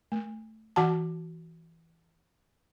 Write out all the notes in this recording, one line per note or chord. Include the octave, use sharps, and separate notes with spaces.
A3
E3 F#4 F#5 A5